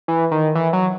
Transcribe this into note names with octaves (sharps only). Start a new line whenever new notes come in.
E3
D#3
E3
F#3